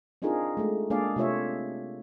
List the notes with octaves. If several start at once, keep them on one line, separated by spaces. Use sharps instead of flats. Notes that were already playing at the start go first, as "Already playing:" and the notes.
C4 D4 D#4 F4 G#4 A#4
G#3 A3
G#3 A#3 D4 G#4 D5 F5
C3 A3 F4 C#5 E5